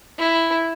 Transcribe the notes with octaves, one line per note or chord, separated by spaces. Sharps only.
E4